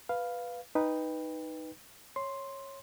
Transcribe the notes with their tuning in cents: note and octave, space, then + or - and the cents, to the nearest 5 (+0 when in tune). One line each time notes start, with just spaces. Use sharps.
B4 +0 F5 +0
D#4 +0 B4 +0 G5 +25
C#5 -10 C6 +5